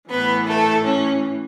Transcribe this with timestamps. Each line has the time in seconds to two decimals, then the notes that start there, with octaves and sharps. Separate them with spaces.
0.10 A2 E3 B3 B4
0.47 A3 A4
0.84 C#4